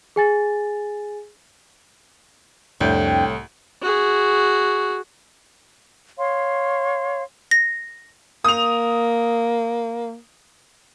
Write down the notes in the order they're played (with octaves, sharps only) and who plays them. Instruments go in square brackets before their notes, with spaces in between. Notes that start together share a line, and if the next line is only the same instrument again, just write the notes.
[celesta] G#4 G#5 A6
[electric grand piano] C2 [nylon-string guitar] F2 D4 [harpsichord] A2 [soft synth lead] G5
[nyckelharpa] F#4 G#4
[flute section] C#5 F5 C6
[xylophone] A#6
[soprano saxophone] A#3 [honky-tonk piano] D#6 F7